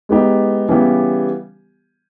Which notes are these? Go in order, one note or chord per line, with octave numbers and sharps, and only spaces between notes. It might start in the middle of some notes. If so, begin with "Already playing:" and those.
G#3 B3 D#4 G4
C#3 E3 G3 B3 G4